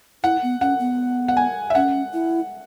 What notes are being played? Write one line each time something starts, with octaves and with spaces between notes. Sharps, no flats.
E4 F#5
B3
C#4 F#5
B3
F#5
G#5
E5
C#4 F#5
E4